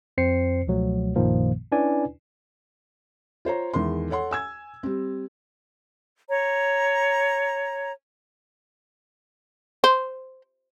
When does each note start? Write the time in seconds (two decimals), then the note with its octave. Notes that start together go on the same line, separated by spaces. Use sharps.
0.18 F2 C4 C5 C7 C#7
0.67 C#2 B2 F3 F#3 A3
1.16 A#1 F#2 A#2 D#3 F3 A#3
1.72 C#4 D4 E4 B4 D5 G#5
3.45 F4 C5 C#5 A#5
3.73 E2 D#3 G#3 C6
4.10 A4 C#5 F#5 C6
4.31 G#5 E6 G#6
4.83 G3 C4
6.29 C#5 A#5
9.84 C5